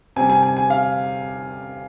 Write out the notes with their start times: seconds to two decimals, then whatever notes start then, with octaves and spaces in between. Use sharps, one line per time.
0.16 C3 G3 G#5
0.30 G#5
0.43 G#5
0.57 G#5
0.70 F5